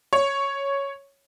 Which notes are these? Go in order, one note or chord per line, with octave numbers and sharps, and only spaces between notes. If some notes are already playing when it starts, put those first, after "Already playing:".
C#5